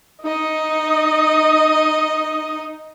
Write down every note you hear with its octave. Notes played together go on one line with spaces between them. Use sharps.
D#4 D#5